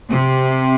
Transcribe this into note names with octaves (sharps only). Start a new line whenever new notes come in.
C3